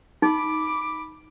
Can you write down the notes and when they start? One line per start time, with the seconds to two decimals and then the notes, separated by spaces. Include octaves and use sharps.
0.22 D#4 B5 D6